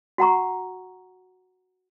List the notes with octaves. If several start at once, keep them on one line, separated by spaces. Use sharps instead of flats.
F#4 F#5 A#5 C#6